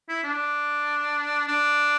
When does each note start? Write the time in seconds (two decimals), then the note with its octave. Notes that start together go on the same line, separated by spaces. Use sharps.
0.09 E4
0.24 D4
1.48 D4